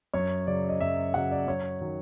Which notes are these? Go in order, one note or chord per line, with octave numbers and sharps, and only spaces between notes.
F#2 C#5
C#3 F#3 D5
D#5
F#2 E5
C#3 F#3 F#5
D5
F#2 C#5
D#3 F#3